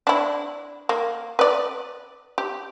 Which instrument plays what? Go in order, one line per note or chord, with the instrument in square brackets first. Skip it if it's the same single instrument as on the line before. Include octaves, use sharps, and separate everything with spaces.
[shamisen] D4 E4
A#3
B4 D5
G4